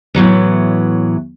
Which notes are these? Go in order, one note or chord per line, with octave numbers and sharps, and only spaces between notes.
A2 E3 F#3 B3